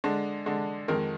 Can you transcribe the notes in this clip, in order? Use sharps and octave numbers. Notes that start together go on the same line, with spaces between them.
D3 G#3 D4
D3 G#3 D4
F2 D#3 G#3 A#4